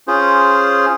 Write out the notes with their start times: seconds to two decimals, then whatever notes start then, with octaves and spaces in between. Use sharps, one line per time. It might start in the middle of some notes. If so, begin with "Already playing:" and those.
0.08 C#4 F4 G#4 C5